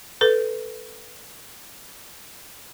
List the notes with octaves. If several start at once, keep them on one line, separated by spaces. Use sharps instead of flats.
A4 B4